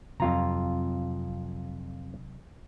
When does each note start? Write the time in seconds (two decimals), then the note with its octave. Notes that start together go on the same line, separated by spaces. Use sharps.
0.20 F2 C3 F#3 F4 A#5